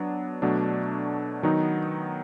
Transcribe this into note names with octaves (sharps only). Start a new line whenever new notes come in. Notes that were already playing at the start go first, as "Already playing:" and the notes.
Already playing: F#3 B3 D4
B2 F#3 A3 D4
D#3 F#3 B3 D#4